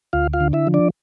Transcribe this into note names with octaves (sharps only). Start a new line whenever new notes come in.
D2 F4 F5
F4 F5
D3
E4 E5
F3
D4 D5